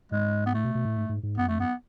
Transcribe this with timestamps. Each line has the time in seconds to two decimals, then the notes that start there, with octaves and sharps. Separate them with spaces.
0.12 G#2 G#3
0.46 B3
0.54 A2 A3
0.65 B2
0.75 B2
0.85 A2
0.96 G#2
1.09 G#2
1.23 G#2
1.38 F#2 B3
1.48 F2 A3
1.59 F#2 B3